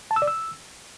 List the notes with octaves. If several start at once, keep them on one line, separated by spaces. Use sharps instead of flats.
A5
E6
D5
E6